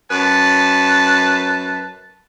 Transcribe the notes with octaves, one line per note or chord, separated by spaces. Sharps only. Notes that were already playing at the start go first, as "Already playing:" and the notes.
F#2 B4 A5